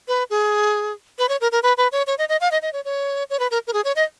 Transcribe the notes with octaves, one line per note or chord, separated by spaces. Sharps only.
B4
G#4
B4
C#5
A#4
A#4
B4
B4
C#5
C#5
D#5
D#5
F5
D#5
D#5
C#5
C#5
C#5
B4
A#4
A#4
G#4
C#5
D#5